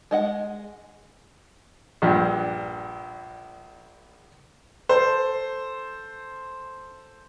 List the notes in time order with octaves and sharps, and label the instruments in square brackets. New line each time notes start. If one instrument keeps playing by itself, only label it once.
[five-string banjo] G#3 D#5 F#5
[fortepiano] A#1 G2
[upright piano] A4 C5